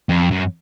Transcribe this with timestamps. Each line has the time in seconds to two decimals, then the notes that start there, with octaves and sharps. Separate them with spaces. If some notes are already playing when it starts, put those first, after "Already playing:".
0.09 F2
0.31 F#2